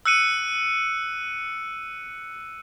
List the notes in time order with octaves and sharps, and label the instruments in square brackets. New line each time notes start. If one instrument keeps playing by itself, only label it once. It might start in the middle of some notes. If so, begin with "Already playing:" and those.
[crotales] E6 F#6 C#7 D#7